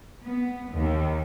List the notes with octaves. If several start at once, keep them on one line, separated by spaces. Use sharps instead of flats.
B3
D#2